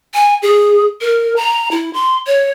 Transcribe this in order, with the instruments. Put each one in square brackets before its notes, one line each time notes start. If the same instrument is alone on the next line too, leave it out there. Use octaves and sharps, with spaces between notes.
[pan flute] G#5
G#4
A#4
A#5
E4
C6
C#5